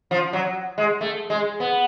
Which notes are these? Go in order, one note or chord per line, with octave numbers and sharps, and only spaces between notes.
F3
F#3
G#3
A3
G#3
B3